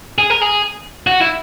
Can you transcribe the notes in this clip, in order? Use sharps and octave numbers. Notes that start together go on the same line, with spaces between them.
G#4
A#4
G#4
F#4
E4